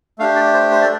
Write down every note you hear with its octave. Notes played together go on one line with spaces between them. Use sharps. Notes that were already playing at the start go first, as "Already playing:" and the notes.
A3 D4 G4 F5
D5
C5
C5
D5